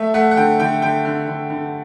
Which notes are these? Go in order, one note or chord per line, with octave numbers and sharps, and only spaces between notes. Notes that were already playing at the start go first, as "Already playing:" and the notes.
Already playing: A3 E5
A3 F#5
F#5
D3 G5
D3 G5
D3 G5
D3
D3
D3